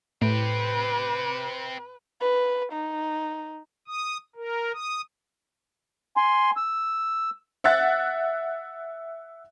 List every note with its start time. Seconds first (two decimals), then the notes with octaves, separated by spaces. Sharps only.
0.22 A2 C4 G4 B4
2.21 B4
2.72 D#4
3.87 D#6
4.36 A#4
4.74 D#6
6.17 G#5 C6
6.57 E6
7.64 E5 F#5 F#6 A6